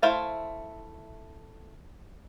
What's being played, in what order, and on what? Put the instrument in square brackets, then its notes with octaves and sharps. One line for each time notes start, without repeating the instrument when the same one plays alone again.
[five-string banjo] A3 E4 C5 F5 A5